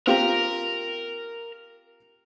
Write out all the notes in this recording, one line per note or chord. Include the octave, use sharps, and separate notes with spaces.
C4 F4 G4 A#4 A#5